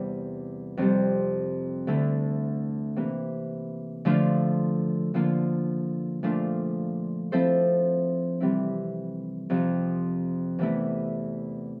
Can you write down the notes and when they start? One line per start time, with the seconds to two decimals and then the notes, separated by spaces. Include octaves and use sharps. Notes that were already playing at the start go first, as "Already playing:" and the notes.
Already playing: E2 C3 G3
0.77 F2 C3 G3 C4
1.87 D2 D3 A3 E4
2.96 C3 E3 A#3
4.05 D3 F3 A3 D4 F4
5.14 D3 F3 A#3 F4
6.23 A#2 F3 A3 D4 F4
7.32 F3 C4 E4 A4 C5
8.40 C3 E3 G3 C4 E4
9.50 F2 C3 F3
10.59 E2 C3 E3 A3 E4